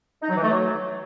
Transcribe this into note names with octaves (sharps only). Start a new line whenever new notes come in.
D#4
F#3
E3
A3
F#3